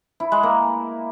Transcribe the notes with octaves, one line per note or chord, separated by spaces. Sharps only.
E4
G#3
A#3